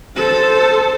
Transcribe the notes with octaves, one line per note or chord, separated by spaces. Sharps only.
A4 C5